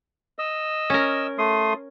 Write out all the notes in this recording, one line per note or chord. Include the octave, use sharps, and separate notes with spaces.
D#5 E6
C#4 A#4
A3 C6 D#6